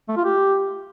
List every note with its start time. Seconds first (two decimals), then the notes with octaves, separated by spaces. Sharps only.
0.08 A3
0.17 F4
0.25 G4